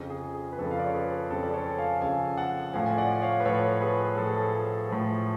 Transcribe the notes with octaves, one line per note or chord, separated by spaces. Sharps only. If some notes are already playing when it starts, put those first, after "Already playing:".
Already playing: F2 C#3 F3
G#4
G#4
B4
F2 C#3 F3 A4
F5
D5
C#5
G#4 B4
F2 C#3 F3 A4
D5
A4 C#5
A5
F5 G#5
F2 C#3 F3 F5 G#5
F#5 A5
A2 F3 F5 G#5
G#5
D5 F#5
C#5 F5
B4
A2 F3 A4 C#5
G#4 B4
A2 F3 A4
G#4
A4
A4
A2 F3